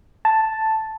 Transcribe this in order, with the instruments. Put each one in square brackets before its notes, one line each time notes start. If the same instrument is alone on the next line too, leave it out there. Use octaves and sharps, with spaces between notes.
[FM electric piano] A5